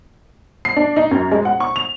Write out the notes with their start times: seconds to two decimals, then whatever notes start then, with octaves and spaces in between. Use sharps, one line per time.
0.65 C7
0.76 D4
0.96 D#4
1.11 F#2
1.31 G#3
1.45 F#5
1.60 C#6
1.76 F7